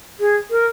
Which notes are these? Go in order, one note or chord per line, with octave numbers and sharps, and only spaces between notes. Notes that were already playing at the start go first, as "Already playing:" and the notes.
G#4
A#4